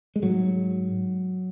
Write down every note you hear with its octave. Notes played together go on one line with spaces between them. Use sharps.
G#3
G#2 F#3